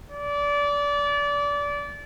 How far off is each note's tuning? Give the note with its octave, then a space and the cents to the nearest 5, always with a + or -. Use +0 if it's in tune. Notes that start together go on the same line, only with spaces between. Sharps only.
D5 -25